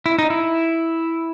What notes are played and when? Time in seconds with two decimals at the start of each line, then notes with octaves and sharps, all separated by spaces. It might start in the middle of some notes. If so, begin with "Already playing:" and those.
0.06 E4
0.19 D#4
0.30 E4